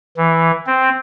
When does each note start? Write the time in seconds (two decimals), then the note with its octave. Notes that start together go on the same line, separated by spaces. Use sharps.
0.17 E3
0.67 C4